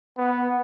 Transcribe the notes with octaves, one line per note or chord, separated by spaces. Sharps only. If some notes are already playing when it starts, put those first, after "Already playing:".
B3